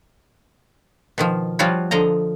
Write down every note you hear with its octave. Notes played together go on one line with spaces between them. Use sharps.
B2 D#3 F3
F3 G3 F4 F#4 C#5
D3 F3 D#5 A#5